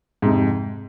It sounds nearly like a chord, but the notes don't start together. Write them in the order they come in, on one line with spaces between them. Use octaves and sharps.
G#2 C3 F2